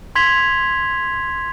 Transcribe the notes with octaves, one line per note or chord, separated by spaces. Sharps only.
C6 G#6 B6 F7 G7